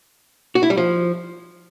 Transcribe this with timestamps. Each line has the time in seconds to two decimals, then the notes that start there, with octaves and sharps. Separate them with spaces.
0.55 F#4
0.63 E4
0.70 G3
0.78 F3